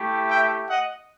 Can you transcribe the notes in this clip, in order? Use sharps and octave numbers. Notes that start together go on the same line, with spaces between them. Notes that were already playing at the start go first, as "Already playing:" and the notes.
Already playing: A3 E4 G4
E5 G5
D#5 F#5